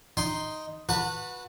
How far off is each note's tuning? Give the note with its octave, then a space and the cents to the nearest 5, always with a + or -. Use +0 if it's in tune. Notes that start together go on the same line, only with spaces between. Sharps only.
D#4 +0 G5 +0 C6 +0
F#4 -20 B4 -10 A5 +35